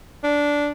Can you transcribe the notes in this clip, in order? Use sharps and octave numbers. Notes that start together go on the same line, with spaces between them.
D4